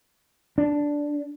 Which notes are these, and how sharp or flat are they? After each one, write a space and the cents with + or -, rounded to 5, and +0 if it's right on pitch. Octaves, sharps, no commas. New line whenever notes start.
D4 -5